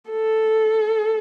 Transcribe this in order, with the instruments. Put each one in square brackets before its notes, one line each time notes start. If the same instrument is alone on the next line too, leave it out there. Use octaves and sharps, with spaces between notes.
[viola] A4